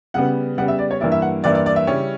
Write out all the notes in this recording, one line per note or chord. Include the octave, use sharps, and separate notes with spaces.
C#3 G3 B3 F#5
C#3 G3 B3 F#5
E5
D5
C#5
G2 E3 A#3 E4 D5
E5
F#5
G2 E3 A#3 E4 D5
D5
D5
E5
C#3 G3 C#4 E4